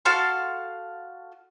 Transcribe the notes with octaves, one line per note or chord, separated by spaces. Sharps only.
F#4 A4 F5 C6